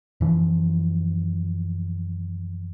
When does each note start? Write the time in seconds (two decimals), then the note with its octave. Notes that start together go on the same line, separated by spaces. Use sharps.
0.21 F#2 E3 F3